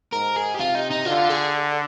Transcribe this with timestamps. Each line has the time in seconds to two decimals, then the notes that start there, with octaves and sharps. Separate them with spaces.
0.13 G#2 A#4
0.37 G#4
0.55 G4
0.59 C3 F4
0.75 D#4
0.91 D#4
1.06 D3 F4
1.30 G#4